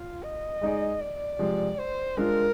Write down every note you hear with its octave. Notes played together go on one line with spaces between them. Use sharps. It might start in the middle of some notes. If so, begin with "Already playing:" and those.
Already playing: F4
D#5
G#3 D#4 G#4 D5
D5
C3 F3 G#3
C5
G#3 D4 F4 A#4